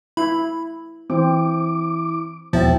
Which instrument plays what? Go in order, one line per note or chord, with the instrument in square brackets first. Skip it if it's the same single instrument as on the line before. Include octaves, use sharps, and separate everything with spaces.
[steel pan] E4 [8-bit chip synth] B5
[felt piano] E3 [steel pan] C4 [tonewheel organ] D6
[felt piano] E1 E5 G5 [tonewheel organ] D#2 E4 A6 [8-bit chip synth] F3